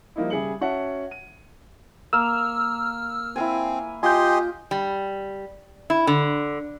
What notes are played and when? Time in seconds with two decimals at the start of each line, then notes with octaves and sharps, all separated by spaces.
0.16 F3 G3 A#3 D#4 E4
0.30 C#3 G3 G#4 E5 C#7 F#7
0.61 C#4 F#4 C#5 E5 F#5 A5
1.11 D#7
2.13 A#3 E6 F6
3.36 C4 E4 F5 G#5
4.03 F4 G4 D#5 G#5 C6 G6
4.71 G3
5.90 E4
6.07 D3